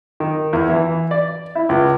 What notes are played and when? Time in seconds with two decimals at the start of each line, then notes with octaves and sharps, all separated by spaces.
0.20 D#3
0.53 E2
0.69 E3
1.11 D5
1.55 E4
1.69 C#2